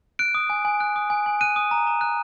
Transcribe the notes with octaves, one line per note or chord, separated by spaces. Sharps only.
F#6 D7
D#6
G#5
G#5
F#6
D#6
G#5
G#5
F#6 D#7
D#6
A#5
A#5
F#6